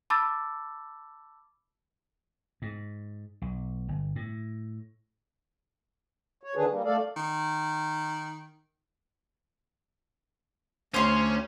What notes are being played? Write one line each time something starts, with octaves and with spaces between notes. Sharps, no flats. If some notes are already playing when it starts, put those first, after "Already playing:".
A5 B5 D6 E6 A6
G#2
B1
G1
A2
C#5
D3 D#3 D4 G#4 B4
G3 A#3
A3 A4 D5 F5
D#3
D2 C#4 C5 C#5 C6